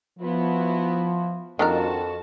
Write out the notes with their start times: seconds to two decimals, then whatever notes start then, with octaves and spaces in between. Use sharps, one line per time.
0.19 F3 B3 E4 F#4
1.59 F2 D#3 D4 F#4 A#4 A5